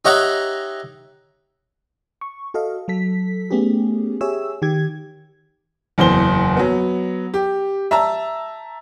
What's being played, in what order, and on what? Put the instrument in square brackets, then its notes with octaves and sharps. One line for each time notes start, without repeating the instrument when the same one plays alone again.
[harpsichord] D#4 G4 C#5 E5 F#5 A#5
[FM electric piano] C#6
F#4 A4 D#5 F5
F#3 A4 B6
A3 B3 C#4 G4 G#4
G4 G#4 C#5 E5 E6
D#3 G4 G#6
[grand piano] F#1 E2 C5 G7
F#3 B3
G4
E5 A5 A#5 E6